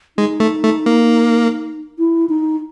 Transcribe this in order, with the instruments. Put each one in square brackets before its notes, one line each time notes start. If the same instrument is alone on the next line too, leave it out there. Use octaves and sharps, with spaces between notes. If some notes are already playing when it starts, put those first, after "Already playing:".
[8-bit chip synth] G#3 [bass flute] D#4
[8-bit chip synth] A3
A3
A#3
[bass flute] E4
D#4